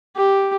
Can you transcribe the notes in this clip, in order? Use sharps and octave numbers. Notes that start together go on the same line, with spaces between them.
G4